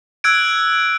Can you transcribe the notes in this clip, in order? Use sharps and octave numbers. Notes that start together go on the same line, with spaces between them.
E6 F#6 G#6 D7